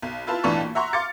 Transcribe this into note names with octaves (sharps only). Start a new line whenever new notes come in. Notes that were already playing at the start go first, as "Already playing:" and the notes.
B1
E4 F4 B4 A5
B1 A2 E3 D4 A5 C#6
A#2
E5 F#5 A#5 C6 C#6
F5 C6 D6 F6 A6 C#7